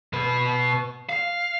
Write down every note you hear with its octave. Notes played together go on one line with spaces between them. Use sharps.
B2 B4
F5